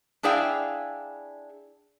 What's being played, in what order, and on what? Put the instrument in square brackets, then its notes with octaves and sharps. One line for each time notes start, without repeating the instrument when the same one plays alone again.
[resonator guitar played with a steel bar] D4 E4 G#4 D5 F5 G5